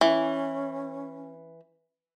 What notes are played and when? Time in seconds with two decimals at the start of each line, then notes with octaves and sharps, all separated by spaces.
0.01 E3 C#4